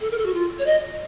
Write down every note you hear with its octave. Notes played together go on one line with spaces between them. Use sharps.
A4
A#4
A4
F#4
F4
C#5
D#5